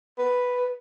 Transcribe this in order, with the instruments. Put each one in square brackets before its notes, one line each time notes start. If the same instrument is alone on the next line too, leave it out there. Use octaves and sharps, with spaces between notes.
[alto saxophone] B4